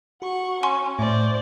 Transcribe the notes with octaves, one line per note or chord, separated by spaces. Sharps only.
F#4 F#5 C#6
C#4 G#5 C6 C#6
A2 C5 D5